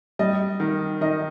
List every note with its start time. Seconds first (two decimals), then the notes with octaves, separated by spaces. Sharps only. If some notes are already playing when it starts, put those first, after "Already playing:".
0.19 G3 D#5
0.60 D#3
1.01 D#3 D#5